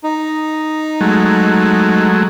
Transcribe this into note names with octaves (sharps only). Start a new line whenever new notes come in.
D#4
F#3 G#3 A3